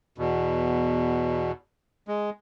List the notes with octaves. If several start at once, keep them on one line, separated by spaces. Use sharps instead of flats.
E2 B2
G#3